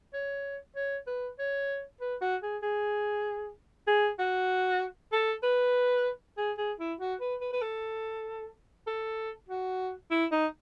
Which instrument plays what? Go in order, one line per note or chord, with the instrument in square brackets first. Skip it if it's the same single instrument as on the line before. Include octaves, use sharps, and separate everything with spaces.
[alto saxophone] C#5
C#5
B4
C#5
B4
F#4
G#4
G#4
G#4
F#4
A4
B4
G#4
G#4
E4
F#4
B4
B4
B4
A4
A4
F#4
E4
D#4